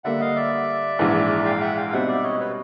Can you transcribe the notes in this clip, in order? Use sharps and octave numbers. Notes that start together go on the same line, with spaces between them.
D3 G3 A#3 E5 F#5
D#5 F5
D5 E5
A#1 G#2 E3
F5 G5
E5 F#5
F5 G5
B2 G3 C4 D#4 E5 F#5
D5 E5
C#5 D#5
B4 C#5